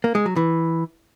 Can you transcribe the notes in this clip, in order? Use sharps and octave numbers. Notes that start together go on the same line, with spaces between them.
A#3
G#3
F#3
E3